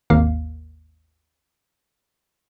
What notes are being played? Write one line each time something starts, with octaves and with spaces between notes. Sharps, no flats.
G#1 D#2 A#3 F5